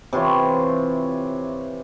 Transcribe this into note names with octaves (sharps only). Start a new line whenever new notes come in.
C3 E3 F4 C#5